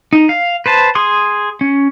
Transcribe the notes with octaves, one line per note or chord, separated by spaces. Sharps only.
D#4
F5
B4 C5 A5
G#4 C6 D#6
C#4